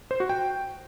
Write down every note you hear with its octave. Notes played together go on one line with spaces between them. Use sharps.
C5
F#4
G5